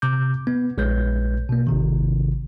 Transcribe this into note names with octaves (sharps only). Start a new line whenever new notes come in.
C3 D6 G6
B3
A#1 G#3 B4 C#5 G6
B2 A#3
G#1 C3 D#3